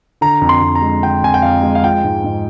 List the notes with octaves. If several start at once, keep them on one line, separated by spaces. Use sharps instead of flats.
D3 A#5
F2
C6
F2
A#5
G#3
D3 G5
F2 G#5
G5
F2 F5
G#3
F5
F3 G5
G#2
G#2